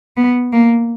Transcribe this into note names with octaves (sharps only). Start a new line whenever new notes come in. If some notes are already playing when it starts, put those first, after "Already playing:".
B3
A#3